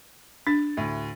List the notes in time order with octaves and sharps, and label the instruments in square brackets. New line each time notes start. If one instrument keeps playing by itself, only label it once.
[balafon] D4 [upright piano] A6
[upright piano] D2 A2